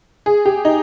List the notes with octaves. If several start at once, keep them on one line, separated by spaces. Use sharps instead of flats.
G#4
G4
D#4